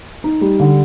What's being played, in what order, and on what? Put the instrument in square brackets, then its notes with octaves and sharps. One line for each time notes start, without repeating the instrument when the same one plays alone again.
[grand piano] D#4
G3
D3